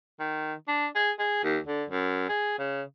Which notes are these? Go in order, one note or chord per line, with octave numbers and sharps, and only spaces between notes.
D#3
D4
G#4
G#4
D#2
D3
F#2
G#4
C#3